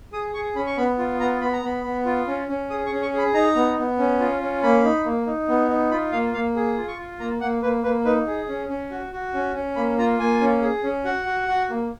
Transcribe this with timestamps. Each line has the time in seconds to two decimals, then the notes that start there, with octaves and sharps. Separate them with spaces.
0.13 G#4 D#6
0.34 G#4 C#6
0.56 C#4 B5
0.67 C#6
0.77 B3 B5
0.98 F4
1.20 B3 A#5
1.41 B3 B5
1.53 A#5
1.63 B3 B5
1.84 B3
2.05 F4
2.27 C#4
2.49 C#4
2.70 G#4 D#6
2.86 C#6
2.91 C#4
3.02 C#6
3.13 G#4 B5
3.34 D#4 A#5
3.56 B3
3.78 B3
3.98 C#4
4.20 F4
4.41 C#4
4.63 A#3 B5
4.84 D#4
5.05 A#3
5.27 D#4
5.49 B3
5.70 D#4
5.91 F4 B5
6.12 A#3 F5
6.34 A#3 F5
6.56 G#4
6.77 F4
6.88 C#6
6.98 F4
7.19 A#3 A#5
7.41 A#3 F#5
7.62 A#3 B4
7.83 A#3 B4
8.05 D#4 B4
8.27 G#4
8.48 C#4
8.69 C#4
8.91 F#4
9.13 F#4
9.34 C#4
9.55 C#4
9.76 A#3 B5
9.98 F4 A#5
10.19 A#3 G#5
10.41 C#4
10.62 G#4
10.83 C#4
11.05 F#4 F#5
11.26 F#4
11.48 F#4
11.70 A#3